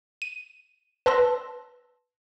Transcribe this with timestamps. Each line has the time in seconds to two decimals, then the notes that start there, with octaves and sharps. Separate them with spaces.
0.22 D#7
1.06 B4 A5 C6 E6 A#6